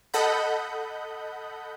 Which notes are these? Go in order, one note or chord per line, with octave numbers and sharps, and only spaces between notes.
A4 D#5 F#5 B5 G6